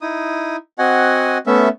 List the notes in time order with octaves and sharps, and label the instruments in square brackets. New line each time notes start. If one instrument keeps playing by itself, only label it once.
[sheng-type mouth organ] D#4 E4 D#6
C4 F#4 D#5 F#5 G#5
A3 B3 C#4 E5